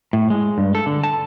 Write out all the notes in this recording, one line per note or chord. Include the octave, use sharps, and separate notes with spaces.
A2
G#3
G2
A4
D3
A5